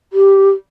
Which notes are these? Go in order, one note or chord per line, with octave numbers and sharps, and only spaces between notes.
G4